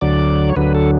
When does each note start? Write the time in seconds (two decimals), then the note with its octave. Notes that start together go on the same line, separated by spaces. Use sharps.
0.01 D2 D3 F#3 D5
0.49 C#5
0.56 D2 D3 F#3 B4
0.75 A4